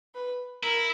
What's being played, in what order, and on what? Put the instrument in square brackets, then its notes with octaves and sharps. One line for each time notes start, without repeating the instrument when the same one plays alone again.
[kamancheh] B4
[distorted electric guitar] E4 [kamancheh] A#4